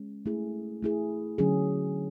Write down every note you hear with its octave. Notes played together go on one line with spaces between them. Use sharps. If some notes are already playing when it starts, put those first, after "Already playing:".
Already playing: G#3 C#4
A3 E4 G#4
A3 E4 G#4
D3 F#3 C#4 G#4